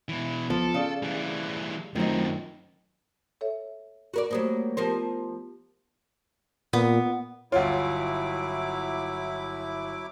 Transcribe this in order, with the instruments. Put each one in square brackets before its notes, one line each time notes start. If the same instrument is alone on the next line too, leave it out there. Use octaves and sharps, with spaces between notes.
[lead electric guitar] B2 E3
[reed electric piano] C#2 B3 [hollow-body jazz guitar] F3 [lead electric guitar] A4
[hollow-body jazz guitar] C#3 [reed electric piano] G#4 D5 F5
[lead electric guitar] E3 G3
[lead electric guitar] F#2 C4 [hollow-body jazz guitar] D#3 D#4 [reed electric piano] F#3 A3 F4
[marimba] A4 C#5 E5
[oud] F#4 A#4 D5
[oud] F#3 G3 A#3 [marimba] A3 C5 D#6
[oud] F3 A#4 C5 [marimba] B3 G4
[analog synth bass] A#2 [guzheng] B3
[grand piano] G1 F4 [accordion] F#3 E4 D6 [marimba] C#5 F#5